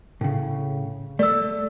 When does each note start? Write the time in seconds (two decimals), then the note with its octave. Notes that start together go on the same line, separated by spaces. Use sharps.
0.21 A2 C#3
1.19 A3 D5 E6